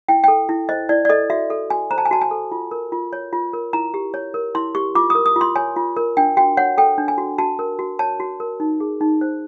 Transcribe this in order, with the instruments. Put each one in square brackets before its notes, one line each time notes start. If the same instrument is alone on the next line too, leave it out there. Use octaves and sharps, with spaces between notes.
[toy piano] E4 G5
A4 G5
E4
C5 D#5
E4 D5
D5
A4 D#5
F#4 E5
A4
F#4 G#5
C5 A#5
A5
G#5
F#4 A5
G#5
A4
F4
A#4
F4
C#5
F4
A#4
E4 A#5
G4
C#5
A#4
E4 C6
G4 C#6
F4 D6
A#4 D#6
D#6
F4 C6
C#5 G#5
F4
A#4
D4 G5
F#4 G5
C#5 F#5
A4 G5
D4
G#5
F#4
F#4 A5
A#4
F#4
C#5 A5
F#4
A#4
D#4
G#4
D#4
C5